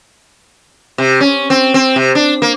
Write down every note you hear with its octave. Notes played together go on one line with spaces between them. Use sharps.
C3
C#4
C4
C4
C3
D4
A#3